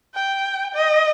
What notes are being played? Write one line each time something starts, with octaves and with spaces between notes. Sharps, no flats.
G5
D#5